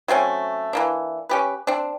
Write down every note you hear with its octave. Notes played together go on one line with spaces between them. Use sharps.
F#3 A3 C4 C#4
E3 A#3 D4
C#4 G4 B4
C4 D4